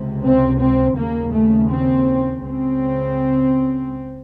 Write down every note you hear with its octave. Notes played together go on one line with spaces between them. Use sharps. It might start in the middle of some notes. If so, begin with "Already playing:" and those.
Already playing: C#2 C3
C4
C4
D#2 C#3 A#3
A3
C4
C#2 C#3 C4